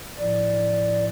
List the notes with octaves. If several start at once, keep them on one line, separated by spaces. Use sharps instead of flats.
A2 F3 D5